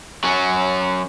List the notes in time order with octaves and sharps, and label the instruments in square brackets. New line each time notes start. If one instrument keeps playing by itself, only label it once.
[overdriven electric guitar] F#3 C#4